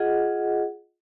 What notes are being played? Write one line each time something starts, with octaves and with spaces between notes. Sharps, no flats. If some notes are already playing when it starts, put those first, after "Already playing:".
Already playing: F4 G#4 D#5 F#5